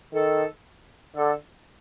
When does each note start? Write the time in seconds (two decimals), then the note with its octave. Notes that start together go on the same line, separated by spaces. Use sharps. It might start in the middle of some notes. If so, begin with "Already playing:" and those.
0.13 D#3 A4
1.16 D3 A4